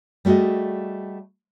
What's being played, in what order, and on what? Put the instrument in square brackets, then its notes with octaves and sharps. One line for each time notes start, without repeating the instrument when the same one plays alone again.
[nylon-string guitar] G3 A3 F#4 G#4 D#5